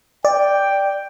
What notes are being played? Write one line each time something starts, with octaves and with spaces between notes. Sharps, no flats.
D5 G5